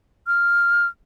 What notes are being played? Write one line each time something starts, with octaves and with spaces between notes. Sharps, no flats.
F6